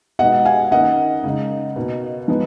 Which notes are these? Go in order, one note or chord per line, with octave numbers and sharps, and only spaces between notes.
B2 G#3 D#4 D#5 F#5
F5 G#5
D#3 A#3 C#4 D#5 F#5
C#3 G#3 D#4
B2 A#3 D#4
F3 G#3 B3 D#4